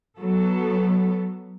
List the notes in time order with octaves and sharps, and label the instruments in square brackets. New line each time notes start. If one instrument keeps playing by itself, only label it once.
[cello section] F#3 B3 A4